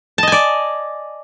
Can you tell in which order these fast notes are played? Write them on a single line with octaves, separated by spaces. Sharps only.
A5 D#5 G#5 D5